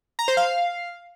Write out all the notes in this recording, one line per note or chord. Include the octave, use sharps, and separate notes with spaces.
A#5
C5
F5